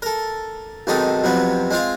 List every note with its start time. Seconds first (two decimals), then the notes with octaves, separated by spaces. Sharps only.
0.02 A4 A#4
0.87 B1 G#2 D#3 C4 A4 D#6
1.24 F2 C3 F#3 B3 C4
1.71 G#3 C4 F4 F5